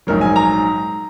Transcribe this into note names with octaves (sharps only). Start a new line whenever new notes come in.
A#1 G#2 F#3 A#4
G#5
A#5